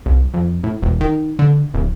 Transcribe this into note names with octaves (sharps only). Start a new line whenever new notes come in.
C2
F2
A2
E1
D#3
D3
D1